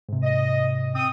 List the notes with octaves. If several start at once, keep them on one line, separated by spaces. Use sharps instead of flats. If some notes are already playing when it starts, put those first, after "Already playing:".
G#2 C3
D#5
C4 D#6